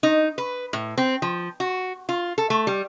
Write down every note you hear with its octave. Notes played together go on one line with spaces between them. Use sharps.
D#4
B4
A2
C4
F3
F#4
F4
A4
A3
G3